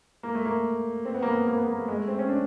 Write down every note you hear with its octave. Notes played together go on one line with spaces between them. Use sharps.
A#3
A3
A#3
C4
B3
A#3
B3
A#3
B3
A#3
A3
G#3
A3
C4
C#4
D4